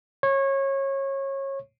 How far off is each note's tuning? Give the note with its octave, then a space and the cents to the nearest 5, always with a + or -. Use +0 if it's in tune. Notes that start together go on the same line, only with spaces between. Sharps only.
C#5 -25